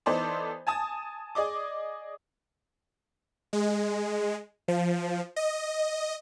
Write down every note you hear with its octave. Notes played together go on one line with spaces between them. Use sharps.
E3 B3 D#4 A4 C5 D5
G#5 A5 D#6
G#4 D5 D#5 D6
G#3
F3
D#5